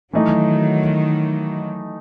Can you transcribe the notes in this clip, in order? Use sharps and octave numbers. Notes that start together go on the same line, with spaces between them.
D#3 E3 F#3 A3 D#4